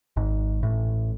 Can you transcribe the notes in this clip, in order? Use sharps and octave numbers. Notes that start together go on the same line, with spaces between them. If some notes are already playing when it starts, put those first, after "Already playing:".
G#1 G#2
A1 A2